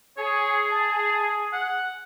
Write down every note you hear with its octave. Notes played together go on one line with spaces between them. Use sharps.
G#4 C#5
A5
F#5